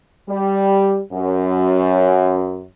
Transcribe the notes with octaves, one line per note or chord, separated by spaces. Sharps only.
G3
F#2